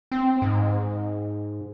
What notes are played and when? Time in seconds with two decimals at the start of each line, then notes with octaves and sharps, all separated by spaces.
0.12 C4
0.42 G#2